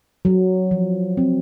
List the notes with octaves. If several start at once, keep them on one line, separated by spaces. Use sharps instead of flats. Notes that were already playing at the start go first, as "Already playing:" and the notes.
F#3
F3
C4